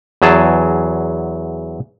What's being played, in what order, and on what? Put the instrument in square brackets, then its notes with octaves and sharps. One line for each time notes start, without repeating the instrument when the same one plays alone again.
[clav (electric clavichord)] E2 F#3 G#4 A5